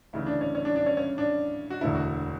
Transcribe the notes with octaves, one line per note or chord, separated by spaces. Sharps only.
D2 C#3 E3 E4
D4
C#4
C#4
D4
D4
C#4
C#4
D4
F#4
E1 D2 D3 E4
F#4